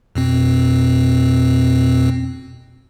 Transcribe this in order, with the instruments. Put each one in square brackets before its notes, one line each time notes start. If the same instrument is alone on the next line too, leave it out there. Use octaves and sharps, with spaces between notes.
[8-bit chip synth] F2 B2 C4